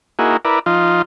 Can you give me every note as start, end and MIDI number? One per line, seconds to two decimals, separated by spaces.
0.19 0.37 58
0.19 0.37 63
0.19 0.37 64
0.19 0.37 66
0.19 0.37 68
0.45 0.59 64
0.45 0.59 70
0.45 0.59 71
0.45 0.59 74
0.66 1.02 53
0.66 1.02 63
0.66 1.02 65